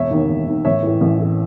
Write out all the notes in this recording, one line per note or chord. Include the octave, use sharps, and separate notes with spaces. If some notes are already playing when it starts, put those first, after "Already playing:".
Already playing: E1 C#5 E5
D#2 D#3
E1
D#2 D#3
A1 C#5 E5
A2 E3
A1
A2 E3